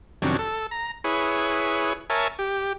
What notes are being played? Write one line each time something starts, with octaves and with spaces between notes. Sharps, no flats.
F2 C3 D#3 F#3 C#4 D4
A4
A#5
E4 G#4 B4 C#5
A#4 C#5 E5 G#5 A5
G4